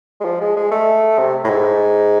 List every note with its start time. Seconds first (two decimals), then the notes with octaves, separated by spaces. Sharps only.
0.21 G#3
0.25 F3
0.41 G#3
0.56 G#3
0.71 A3
1.18 C3
1.44 A2
1.49 G#2